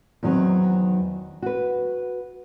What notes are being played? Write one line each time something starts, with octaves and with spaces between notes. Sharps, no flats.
E2 D#3 F#3 C4 D#4
F#4 B4